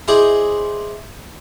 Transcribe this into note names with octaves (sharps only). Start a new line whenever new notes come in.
E4 G#4 C5 D5 D#5 C6